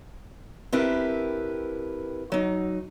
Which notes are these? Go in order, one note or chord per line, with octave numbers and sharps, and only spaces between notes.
C4 D4 E4 G4 A#4 B4
F#3 D#4